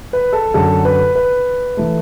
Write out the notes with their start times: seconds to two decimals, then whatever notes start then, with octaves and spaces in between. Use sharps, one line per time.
0.13 B4
0.33 A4
0.54 F#2 D3 F#3 A4
0.85 B4
1.15 B4
1.77 E3 A3